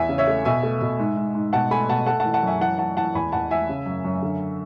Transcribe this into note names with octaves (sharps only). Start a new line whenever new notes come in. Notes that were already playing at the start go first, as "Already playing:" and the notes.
Already playing: E2 E5 G#5
C#3
C#5 E5
A3
B2 E5 G#5
A3
B2
G#2
G#2
G#2
B2 F#5 A5
A3 G#5 B5
B2 F#5 A5
A3 F#5 A5
F#5 A5
E3
F#5 A5
F#2 E5 G#5
E3 F#5 A5
E3 F#5 A5
E3 F#5 A5
E2 G#5 B5
E2 F#5 A5
E3 E5 G#5
C#3
F#2
F#2
D3